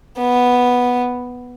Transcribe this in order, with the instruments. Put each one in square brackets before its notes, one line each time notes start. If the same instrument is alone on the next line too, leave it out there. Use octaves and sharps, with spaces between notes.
[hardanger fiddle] B3